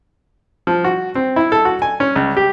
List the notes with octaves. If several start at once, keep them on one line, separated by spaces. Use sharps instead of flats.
F3
F#4
C4
E4
A4
F#4
G#5
C#4
C#2
G4